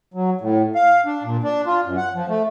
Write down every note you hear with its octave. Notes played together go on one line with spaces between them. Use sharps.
F#3
A2
F5
D4
A#2
D4
F4
F#2
F#5
F3
A3